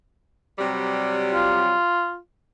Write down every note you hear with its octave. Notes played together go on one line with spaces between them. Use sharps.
C3 F#3 G3
F4